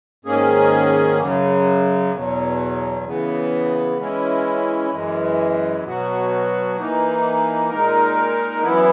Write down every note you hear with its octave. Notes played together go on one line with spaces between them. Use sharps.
G#2 D#3 A#3 C#4 G#4
F#2 C#3 F#3
E2 B2 F#3
C#3 E3 B3
E3 G#3 C#4 E4
F#2 E3 G#3
B2 F#3 B3 F#4
E3 A#3 D#4
A#2 G#3 D#4 A#4
F#2 E3 B3 E4